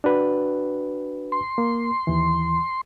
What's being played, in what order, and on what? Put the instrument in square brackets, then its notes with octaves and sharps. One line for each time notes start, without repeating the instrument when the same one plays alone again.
[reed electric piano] D4 F#4 B4
[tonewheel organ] C6
[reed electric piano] A#3
D#2 E3